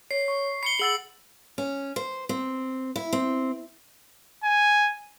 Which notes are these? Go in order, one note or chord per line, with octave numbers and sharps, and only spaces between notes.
C#5 C7
C#6
B5 C7 C#7 G7
G#4 F#5 E6 A6 F#7
C#4
C5
C4
E4
C4
G#5